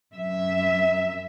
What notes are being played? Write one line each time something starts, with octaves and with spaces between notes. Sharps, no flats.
F#2 E5